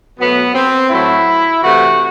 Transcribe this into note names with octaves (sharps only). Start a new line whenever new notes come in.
B2 F#3 A3 B3
C4
A2 F#3 A3 E4
C3 E3 A3 F#4